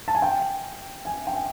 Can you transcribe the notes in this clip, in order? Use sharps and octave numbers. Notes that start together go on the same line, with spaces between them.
A5
G#5
G5
G#5
G5
G#5